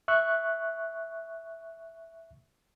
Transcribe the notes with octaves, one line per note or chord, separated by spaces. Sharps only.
E5 C#6 F#6